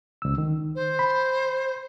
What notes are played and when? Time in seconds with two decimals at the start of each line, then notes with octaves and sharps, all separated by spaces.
0.22 C#2 E6
0.38 D#3
0.75 C5
0.99 B5